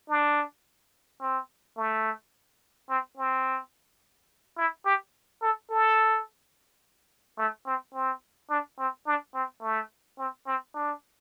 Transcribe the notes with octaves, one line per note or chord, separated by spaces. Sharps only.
D4
C4
A3
C4
C4
E4
G4
A4
A4
A3
C4
C4
D4
C4
D4
C4
A3
C4
C4
D4